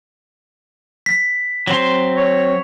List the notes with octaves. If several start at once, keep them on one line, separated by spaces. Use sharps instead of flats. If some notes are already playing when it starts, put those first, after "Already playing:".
B6
F#3 C4 C6
C#5